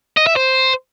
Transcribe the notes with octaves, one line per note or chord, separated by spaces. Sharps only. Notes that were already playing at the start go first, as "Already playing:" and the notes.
D#5
E5
C5